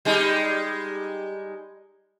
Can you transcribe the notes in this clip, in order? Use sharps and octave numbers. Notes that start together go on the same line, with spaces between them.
G3 G#3 D#4